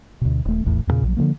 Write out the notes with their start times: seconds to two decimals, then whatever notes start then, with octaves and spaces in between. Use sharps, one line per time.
0.21 D2 B2
0.45 D#1 A3
0.65 D#1 A1 E2 A2
0.87 E2 G2 A#2 C#3
1.03 A#1 F#3
1.17 D3 E3 F3 A#3